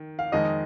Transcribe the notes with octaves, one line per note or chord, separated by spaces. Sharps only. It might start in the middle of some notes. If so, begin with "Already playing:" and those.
Already playing: D#3
F5
F2 D#3 G#3 D#5